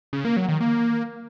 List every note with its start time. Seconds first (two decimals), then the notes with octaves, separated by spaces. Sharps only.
0.13 C#3
0.25 A#3
0.37 F#3
0.49 D#3
0.60 A#3